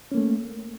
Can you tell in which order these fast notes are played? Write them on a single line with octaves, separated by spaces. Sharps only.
C#4 A#3 A3